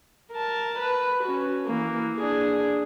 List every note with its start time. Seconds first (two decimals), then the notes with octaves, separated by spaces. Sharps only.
0.32 A#4 A5
0.79 B4
1.23 C#4 F#4
1.65 E3 A#3
2.17 D4 G#4